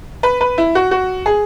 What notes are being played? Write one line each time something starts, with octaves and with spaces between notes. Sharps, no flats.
B4
B4
E4
F#4
F#4
G#4